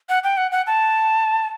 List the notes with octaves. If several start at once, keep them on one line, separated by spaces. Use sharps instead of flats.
F#5
G5
F#5
F#5
A5